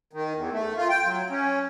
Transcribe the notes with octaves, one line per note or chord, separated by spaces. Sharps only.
D#3
E2
A3
F4
G5
F#3
C#4